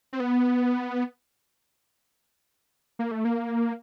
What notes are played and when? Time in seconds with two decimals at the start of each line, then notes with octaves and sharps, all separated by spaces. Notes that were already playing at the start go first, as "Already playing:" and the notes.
0.13 C4
0.20 B3
2.99 A#3
3.11 A3
3.25 A#3